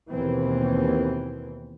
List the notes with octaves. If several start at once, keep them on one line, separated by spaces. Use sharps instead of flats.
D#2 B2 E3 C4